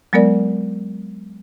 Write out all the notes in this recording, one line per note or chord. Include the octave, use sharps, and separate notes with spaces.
F#3 G#3 B3 A#4 D5